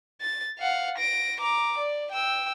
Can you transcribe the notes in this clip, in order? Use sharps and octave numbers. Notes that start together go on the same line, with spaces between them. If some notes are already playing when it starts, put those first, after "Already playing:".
A6
F5 F#5
A#6 D7
A#5 D6
D5
G5 E6